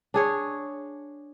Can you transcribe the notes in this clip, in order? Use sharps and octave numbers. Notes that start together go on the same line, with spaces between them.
D4 G#4 C#5